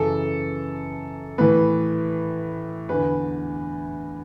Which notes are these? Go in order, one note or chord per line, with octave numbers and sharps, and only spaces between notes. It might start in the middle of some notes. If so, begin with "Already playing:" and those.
Already playing: F#2 C#3 E3 A4
A2 E3 B4
E2 D3 B4